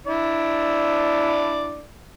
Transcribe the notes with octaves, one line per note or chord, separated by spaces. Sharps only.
D4 E4 D5